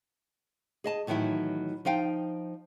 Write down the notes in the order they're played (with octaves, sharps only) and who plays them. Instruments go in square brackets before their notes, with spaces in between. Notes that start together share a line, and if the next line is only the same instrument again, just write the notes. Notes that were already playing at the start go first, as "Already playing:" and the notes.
[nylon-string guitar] G#4 D#5 A5
A2 D#3 E3 F#3 E4
F3 D#4 F5 G5